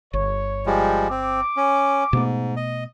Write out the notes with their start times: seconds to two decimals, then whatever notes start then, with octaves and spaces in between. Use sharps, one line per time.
0.13 G1 C#5
0.66 F3 G3 G#3
1.10 C4 D6
1.57 C#4
2.13 G#2 B2 A3 B3
2.56 D#5